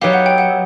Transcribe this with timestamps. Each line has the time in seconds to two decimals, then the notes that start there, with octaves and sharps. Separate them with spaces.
0.01 F#3 B3 D#4 G4 F5
0.13 F#5
0.26 G5
0.38 F#5